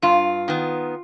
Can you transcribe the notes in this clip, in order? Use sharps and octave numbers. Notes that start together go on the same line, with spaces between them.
G2 F4
D#3 B3